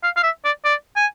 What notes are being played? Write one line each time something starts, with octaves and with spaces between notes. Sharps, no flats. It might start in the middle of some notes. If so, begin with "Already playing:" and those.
F5
F5
E5
D5
D5
G#5